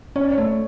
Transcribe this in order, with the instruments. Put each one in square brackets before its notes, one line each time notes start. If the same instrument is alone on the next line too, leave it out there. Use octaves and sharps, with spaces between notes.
[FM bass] C#4 [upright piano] C#5
[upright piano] D5
C#5
[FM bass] A3